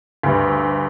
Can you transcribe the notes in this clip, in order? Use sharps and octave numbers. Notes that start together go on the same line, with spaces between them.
D2 G2